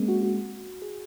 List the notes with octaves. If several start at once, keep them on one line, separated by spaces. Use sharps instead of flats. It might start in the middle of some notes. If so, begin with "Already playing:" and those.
Already playing: G#3 A#3 C4 C#4
F#4
F#4
G#4